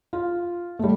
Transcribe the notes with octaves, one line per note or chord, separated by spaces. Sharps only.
F4
G3 A3